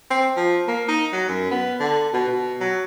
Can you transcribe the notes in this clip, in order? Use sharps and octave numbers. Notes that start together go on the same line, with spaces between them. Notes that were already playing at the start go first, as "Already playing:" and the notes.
C4
F3
A#3
D#4
F#3
F#2
B3
D3
B2
B2
F#3